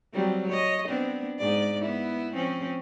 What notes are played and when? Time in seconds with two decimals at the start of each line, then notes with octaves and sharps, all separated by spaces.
0.13 F#3 G3 C4
0.49 C#5 D#5
0.89 B3 C4 D4
1.39 G#2 D5
1.81 B3 E4
2.33 F3 C4 C#4